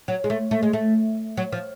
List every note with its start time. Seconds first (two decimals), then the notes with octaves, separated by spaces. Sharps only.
0.08 F#3
0.24 G#3
0.30 A3
0.51 A3
0.63 G#3
0.73 A3
1.37 F#3
1.52 F3